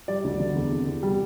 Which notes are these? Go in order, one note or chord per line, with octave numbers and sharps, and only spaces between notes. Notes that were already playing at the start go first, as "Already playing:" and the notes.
G3 D5
D2
D3
E2
C3
E2
G3